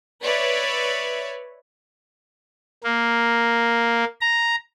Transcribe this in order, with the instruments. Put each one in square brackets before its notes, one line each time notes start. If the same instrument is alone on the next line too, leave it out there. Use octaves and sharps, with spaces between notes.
[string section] B4 C#5 D5 E5
[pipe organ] A#3
A#5